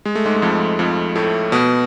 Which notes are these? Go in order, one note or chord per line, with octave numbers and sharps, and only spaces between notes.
G#3
A3
G#2 G#3
G#3
F2 F3
F2 F3
A2 A3
B2 B3